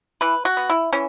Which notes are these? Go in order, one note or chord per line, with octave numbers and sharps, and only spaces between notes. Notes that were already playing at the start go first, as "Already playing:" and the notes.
E3 B4
F#4
B3
E4
E3 C#4